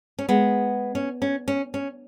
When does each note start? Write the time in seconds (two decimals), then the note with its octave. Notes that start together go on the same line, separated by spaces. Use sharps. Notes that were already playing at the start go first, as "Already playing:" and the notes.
0.19 C#4
0.29 G#3 B3
0.95 C#4
1.22 C#4
1.48 C#4
1.74 C#4